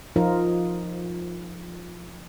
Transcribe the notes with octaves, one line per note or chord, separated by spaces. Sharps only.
F3 D#4 F4 A#4